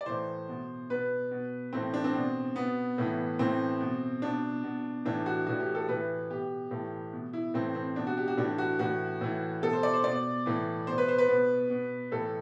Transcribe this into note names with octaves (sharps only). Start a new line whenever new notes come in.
D5
A2 E3 C5
B2
B2 B4
B2
A2 E3 C4
D4
C4
B2
B2 B3
A2 E3
A2 E3 C4
B2
B2 D4
B2
A2 E3 D4
F#4
A2 E3 F#4
G4
A4
A2 E3 B4
B2 G4
A2 E3
B2
E4
A2 E3 C4
C4
B2 D4
F#4
G4
F#4
A2 E3 D4
F#4
A2 E3 F#4
A2 E3
B2 A4
C5
D5
C5
B2 D5
A2 E3
B2 C5
B4
C5
B4
B2
B2
A2 E3 A4